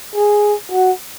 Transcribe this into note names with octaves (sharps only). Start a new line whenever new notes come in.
G#4
F#4